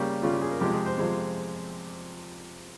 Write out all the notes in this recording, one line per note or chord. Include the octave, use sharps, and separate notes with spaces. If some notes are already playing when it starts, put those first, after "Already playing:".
Already playing: C#3 G3 A#3 G4
C#3 G3 A#3 F4
G4
G#4
A#4
F2 C3 F3 G#3 G4
G#4
C5
F2 C3 F3 G#3 C5